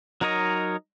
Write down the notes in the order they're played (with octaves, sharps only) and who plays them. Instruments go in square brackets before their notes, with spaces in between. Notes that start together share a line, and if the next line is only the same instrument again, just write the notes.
[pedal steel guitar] F#3 D#4 A#4 C#5 D#5